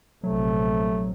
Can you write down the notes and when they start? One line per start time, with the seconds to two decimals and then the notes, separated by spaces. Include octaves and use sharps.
0.24 A#1 C3 F#3 A3